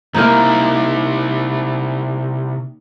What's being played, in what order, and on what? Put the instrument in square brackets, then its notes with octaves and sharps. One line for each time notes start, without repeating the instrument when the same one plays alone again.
[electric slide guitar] C3 E4 [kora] A#3 D#4